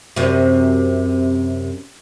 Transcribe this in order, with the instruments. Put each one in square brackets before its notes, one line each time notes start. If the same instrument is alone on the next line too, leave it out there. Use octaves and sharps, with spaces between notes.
[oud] F#2 C3